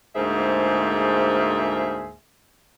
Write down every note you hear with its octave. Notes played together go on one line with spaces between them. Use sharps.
D2 G#2 A#3 G#4 C5 E5